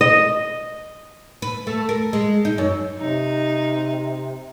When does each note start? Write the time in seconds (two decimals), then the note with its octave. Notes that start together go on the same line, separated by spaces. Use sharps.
0.01 D#5
1.42 B4
1.67 A3
1.89 A#4
2.13 G#3
2.45 D#4
2.58 F#2
2.98 C3 D#4